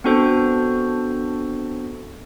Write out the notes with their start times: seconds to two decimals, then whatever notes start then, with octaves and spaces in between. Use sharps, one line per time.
0.04 B3 C4 D4 F#4 A4 C5